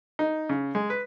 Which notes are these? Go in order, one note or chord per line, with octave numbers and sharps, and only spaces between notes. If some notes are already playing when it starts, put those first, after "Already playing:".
D#4
C#3
G#3
B4